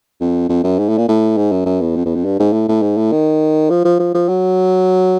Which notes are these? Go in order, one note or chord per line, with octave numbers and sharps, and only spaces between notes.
F2
F2
F#2
G#2
A2
A#2
A2
G#2
F#2
F#2
E2
F2
E2
F2
G2
G#2
A2
A2
G#2
A2
D#3
F3
F3
F3
F3
F#3